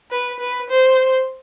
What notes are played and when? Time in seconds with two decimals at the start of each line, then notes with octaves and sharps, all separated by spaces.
0.11 B4
0.40 B4
0.69 C5